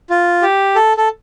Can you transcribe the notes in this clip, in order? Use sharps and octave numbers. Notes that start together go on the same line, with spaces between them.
F4
G4
A4
A4